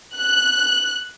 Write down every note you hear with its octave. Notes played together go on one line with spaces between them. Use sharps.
F#6